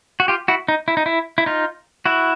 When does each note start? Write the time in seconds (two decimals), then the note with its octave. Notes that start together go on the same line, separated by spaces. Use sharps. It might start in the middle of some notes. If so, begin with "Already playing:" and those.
0.20 F#4
0.28 F4 G4
0.48 E4 F#4
0.68 D#4
0.88 E4
0.97 D#4
1.06 E4
1.38 E4
1.46 D#4 F4
2.06 E4 F#4